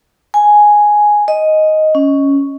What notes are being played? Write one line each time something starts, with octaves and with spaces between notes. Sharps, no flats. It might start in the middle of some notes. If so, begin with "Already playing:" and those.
G#5
D#5
C#4